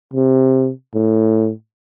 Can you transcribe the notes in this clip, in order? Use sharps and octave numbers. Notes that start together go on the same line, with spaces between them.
C3
A2